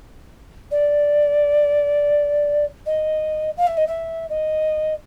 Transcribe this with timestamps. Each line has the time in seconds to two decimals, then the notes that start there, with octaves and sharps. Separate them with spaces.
0.71 D5
2.85 D#5
3.57 F5
3.67 E5
3.77 D#5
3.87 E5
4.29 D#5